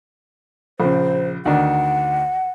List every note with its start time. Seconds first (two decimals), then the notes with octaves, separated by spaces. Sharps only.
0.80 A#1 C#3 C5
1.45 D2 D#3 D4 F#5